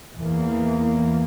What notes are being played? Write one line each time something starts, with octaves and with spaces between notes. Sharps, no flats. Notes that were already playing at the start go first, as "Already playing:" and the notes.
E2 E3 A#3